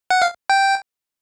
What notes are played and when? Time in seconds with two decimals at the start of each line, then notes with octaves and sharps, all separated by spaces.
0.11 F#5
0.22 F5
0.50 G5